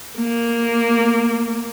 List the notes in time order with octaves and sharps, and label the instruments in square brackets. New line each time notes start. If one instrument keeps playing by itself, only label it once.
[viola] A#3